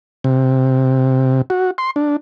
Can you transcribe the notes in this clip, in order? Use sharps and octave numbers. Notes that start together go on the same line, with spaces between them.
C3
F#4
C6
D4